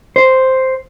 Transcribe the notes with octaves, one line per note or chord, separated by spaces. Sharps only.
C5